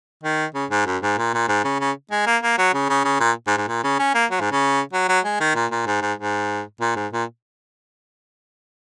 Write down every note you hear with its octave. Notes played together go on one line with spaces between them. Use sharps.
D#3
C#3
G#2
F#2
G#2
A#2
A#2
G#2
C#3
C#3
G#3
A#3
A#3
F#3
C#3
C#3
C#3
A#2
G#2
G#2
A#2
C#3
C#4
A#3
F#3
G#2
C#3
F#3
F#3
G#3
D#3
A#2
A#2
G#2
G#2
G#2
A#2
G#2
A#2